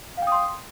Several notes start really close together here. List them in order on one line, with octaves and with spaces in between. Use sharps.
F5 G5 D#6 C6